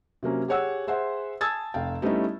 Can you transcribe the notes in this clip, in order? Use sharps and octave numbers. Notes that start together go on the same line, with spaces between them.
C3 F#3 A#3 C#4
G4 G#4 C#5 F#5 E6
G#4 C5 E5 F#5 C6
G#5 A5 D#6 E6 G#6 A6
F1 F5 G5
G3 A3 B3 C#4 D#4 E4